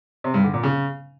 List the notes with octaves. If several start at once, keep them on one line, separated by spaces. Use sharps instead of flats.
C3
G2
D3
A#2
C#3